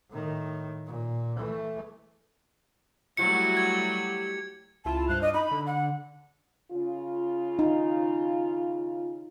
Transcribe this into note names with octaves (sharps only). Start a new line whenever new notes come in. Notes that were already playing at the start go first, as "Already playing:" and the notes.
A2 D#3
A#2
E3 A3
F#3 G3 A3 E4 F#4 C#7
G#6
G4
C#2 E4 F4 A5
G2 C5 F5 F#6
D4 D#5
D#4 B5
D3
F#5
C#3 F4
D#4